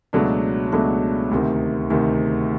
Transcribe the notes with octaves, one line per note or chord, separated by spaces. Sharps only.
C#2 B2 F#3 A3 D4
C#2 B2 F#3 A3 D4
D2 C3 D#3
D2 C3 D#3